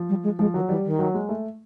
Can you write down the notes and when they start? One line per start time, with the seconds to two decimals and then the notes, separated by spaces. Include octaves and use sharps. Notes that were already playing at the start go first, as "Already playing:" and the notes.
Already playing: F3
0.09 G3
0.23 G#3
0.39 F3 G#3
0.54 D#3 F#3
0.69 E3 G3
0.85 D#3
0.99 F#3
1.14 G#3
1.29 A3